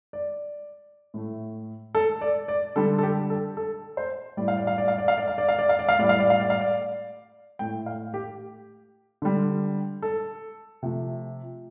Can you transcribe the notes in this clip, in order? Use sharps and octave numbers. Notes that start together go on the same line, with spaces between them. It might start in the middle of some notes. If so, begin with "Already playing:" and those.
D5
A2 A3
A4
D5
D5
D3 G3 A4
A4
G4
A4
A4
C5
A2 G3 D5
F5
D5
F5
D5
F5
D5
F5
D5
F5
D5
F5
D5
F5
D5
F5
A2 G3 D5
F5
D5
F5
D5
F5
D5
A2 A3 G5
F5
G4
D3 G3
A4
C3 F3 A3